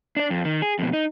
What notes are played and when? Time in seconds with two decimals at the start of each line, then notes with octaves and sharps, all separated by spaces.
0.16 D4 D5
0.30 F2
0.45 D#3
0.62 G#4
0.79 F2 B2
0.93 D#4